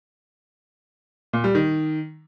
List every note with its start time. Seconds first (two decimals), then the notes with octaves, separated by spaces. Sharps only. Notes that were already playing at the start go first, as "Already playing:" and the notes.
1.33 A#2
1.44 G3
1.55 D#3